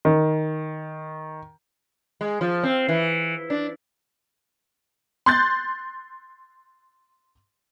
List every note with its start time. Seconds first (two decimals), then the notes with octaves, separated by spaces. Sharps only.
0.05 D#3
2.21 G#3
2.41 F3
2.63 C4
2.89 E3
3.50 D4
5.26 C6 F#6 G6 A6